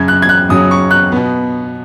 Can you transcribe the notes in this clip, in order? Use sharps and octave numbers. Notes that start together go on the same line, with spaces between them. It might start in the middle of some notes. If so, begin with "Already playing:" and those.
Already playing: F#2 C#3 F#3 G#6
F#6
G#6
F#6
F#2 C#3 F#3 D#6
C#6
F#6
B2 B3